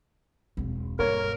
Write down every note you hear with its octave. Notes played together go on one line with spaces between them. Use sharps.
E1 C4
G2 A#3 A#4 C#5